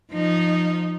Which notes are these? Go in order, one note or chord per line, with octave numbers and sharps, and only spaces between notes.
F3 D#4